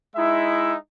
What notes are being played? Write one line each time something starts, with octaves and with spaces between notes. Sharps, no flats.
G#3 D#4 E4 E5